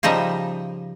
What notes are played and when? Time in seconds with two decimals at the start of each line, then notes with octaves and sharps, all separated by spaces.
0.03 C#3 F3 G3 D#4 D#5 E5